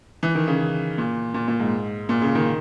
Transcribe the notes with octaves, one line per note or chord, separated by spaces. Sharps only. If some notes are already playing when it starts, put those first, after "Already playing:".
E3
D#3
C#3
A#2
A#2
A#2
G#2
A#2
C#3
D#3